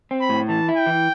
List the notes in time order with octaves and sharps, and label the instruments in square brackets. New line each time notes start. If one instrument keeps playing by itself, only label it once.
[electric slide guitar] C4
[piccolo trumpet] B5
[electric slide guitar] A2
[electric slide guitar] E3 [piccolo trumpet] A5
[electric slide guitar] E4
[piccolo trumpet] G5
[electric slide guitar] E3